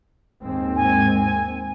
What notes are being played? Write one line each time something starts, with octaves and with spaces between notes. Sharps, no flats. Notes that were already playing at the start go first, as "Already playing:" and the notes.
D#2 G#2 C4
G#5